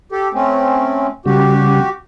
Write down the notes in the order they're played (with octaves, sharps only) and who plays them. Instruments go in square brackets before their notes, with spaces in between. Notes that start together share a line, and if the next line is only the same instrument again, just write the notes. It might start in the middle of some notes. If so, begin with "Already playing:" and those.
[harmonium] G4 A4
A3 C4 C#4
[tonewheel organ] C#3 G3 [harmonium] F#4 G4